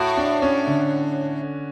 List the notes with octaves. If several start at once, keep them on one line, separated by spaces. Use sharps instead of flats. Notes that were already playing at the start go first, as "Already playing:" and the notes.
Already playing: A2 F#4
D4
C#4
D3